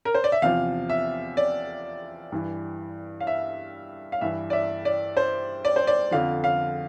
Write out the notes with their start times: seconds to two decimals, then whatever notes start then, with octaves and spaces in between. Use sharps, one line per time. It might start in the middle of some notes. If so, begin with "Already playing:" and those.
0.05 A#4
0.14 C5
0.24 D5
0.32 E5
0.42 E2 C3 F3 F5
0.90 E5
1.37 D5
2.32 G2 E3
3.20 F5
3.27 E5
4.12 F5
4.21 G2 E3 E5
4.50 D5
4.53 E5
4.85 D5
5.17 C5
5.65 D5
5.76 C5
5.87 D5
6.11 F2 D3 F3 F5
6.44 F5